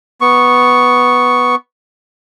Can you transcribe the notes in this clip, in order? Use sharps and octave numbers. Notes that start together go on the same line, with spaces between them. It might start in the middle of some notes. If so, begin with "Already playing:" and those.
B3 C#6